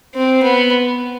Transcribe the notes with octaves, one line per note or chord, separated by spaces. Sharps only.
C4
B3